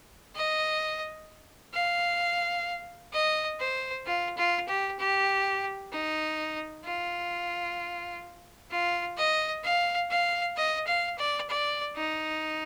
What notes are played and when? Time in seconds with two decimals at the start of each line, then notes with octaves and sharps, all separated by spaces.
0.35 D#5
1.74 F5
3.13 D#5
3.60 C5
4.06 F4
4.37 F4
4.68 G4
4.99 G4
5.92 D#4
6.85 F4
8.71 F4
9.17 D#5
9.64 F5
10.10 F5
10.57 D#5
10.87 F5
11.18 D5
11.50 D5
11.96 D#4